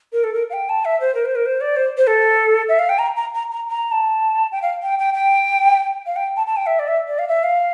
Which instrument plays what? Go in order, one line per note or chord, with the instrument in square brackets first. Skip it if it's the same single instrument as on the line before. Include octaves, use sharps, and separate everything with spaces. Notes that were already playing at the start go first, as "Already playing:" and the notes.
[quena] A#4
A4
A#4
F5
G5
A5
E5
C5
A#4
C5
A#4
C5
D5
C5
C5
A4
E5
F5
G5
A#5
A#5
A#5
A#5
A#5
A5
G5
F5
G5
G5
G5
F5
G5
A5
A5
G5
E5
D5
E5
D5
F5
E5
F5